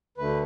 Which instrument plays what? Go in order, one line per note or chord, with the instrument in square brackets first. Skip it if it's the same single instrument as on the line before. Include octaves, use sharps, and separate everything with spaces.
[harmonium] D2 D3 A3 B4